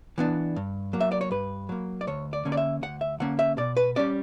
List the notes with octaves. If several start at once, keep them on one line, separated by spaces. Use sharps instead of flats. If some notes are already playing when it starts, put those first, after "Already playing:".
E3 B3 D4
G2
F#3 A#3
E5
D5
C#5
G2 B4
F#3 A#3
D5
D2 C#5
D5
D3 A#3 C#4
D5
E5
D2 F#5
E5
D3 A#3 C#4 F#5
E5
B2 D5
B4
G3 C#4 D5